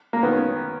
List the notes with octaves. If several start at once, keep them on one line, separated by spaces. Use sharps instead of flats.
A#3
D#3 B3
C#4